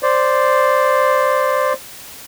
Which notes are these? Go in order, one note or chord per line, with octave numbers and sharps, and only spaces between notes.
C5 D5